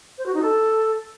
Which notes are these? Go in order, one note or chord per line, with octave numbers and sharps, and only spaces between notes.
C5
F#4
D#4
A4